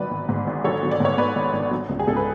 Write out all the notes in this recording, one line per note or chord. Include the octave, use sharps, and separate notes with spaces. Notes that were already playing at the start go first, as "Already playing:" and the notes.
Already playing: G#1 F#3 B4 D5
G#1
G#2
G#1
F#3 A4 C#5
F#3
D5
G#2 C#5
G#2 B4 D5
G#1
G#1
F#3
C#2
G#4
C#2 A4
B4